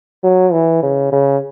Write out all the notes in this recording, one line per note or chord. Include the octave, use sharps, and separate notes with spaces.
F#3
E3
C#3
C#3